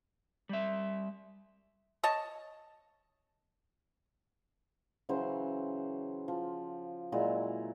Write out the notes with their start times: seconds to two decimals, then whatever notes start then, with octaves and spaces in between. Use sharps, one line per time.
0.49 G3 E5
2.04 C#5 D#5 A5
5.09 C#3 E3 F#3 C5
6.28 F3
7.12 A#2 F#3 G#3 E4